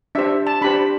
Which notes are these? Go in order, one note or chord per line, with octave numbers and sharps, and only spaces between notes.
D4 G4 C5 E5
A5
D4 G4 C5 B5